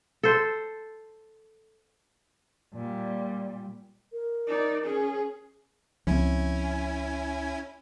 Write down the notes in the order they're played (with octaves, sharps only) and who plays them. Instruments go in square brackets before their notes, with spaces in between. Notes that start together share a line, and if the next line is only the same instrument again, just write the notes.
[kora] A4 C5
[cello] A#2 G3
[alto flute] A#4
[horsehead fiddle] D#4 D5
C#4 G#4
[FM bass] C#2 [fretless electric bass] F3 C4 [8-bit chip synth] C#4 E4 G#5